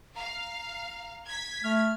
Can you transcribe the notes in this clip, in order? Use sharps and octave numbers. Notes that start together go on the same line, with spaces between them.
F5 A#5
G#6 B6
A3 F6